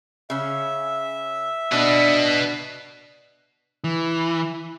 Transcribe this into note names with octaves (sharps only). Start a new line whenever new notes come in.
C#3 C#4 E5
B2 D4 B4 D#5
E3